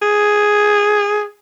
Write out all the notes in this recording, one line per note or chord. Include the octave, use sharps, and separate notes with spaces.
G#4